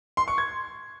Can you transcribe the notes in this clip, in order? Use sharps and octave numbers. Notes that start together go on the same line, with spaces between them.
C6
C#6
G#6